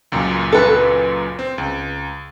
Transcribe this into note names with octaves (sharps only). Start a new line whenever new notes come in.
C#2 F#2 A#2
A4 B4
C4
C#2